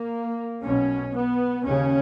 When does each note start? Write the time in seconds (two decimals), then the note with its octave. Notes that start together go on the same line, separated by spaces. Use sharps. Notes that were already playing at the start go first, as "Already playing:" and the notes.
Already playing: A#3
0.63 B1 B2 C#4
1.14 B3
1.64 D#2 C#3 C#4